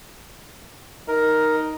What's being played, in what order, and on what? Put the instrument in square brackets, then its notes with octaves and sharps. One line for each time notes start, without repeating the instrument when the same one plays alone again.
[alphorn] D#4 [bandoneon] A#4